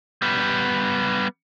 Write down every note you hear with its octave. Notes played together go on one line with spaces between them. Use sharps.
G3 B3